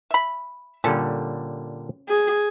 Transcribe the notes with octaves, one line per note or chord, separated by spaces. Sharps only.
E5 B5
A#2 D3 G3 C#4 A4
G#4